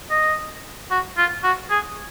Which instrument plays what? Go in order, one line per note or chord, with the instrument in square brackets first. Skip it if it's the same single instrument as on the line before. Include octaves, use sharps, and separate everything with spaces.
[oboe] D#5
F#4
F4
F#4
G#4